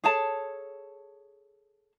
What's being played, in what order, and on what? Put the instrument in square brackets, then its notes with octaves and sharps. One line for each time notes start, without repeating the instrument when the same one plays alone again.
[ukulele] G#4 A4 C#5 A5